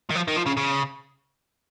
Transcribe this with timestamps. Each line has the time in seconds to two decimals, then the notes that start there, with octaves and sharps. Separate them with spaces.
0.10 D#3
0.15 F3
0.28 D#3
0.36 F3
0.46 C#3
0.57 C#3